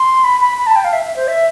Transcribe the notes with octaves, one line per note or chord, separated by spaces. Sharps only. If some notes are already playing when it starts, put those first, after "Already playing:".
Already playing: C6
B5
B5
B5
A5
G5
F5
E5
E5
C5
E5